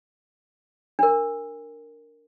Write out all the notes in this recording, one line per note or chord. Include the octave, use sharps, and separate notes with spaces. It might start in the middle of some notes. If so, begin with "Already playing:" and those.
D4 A#4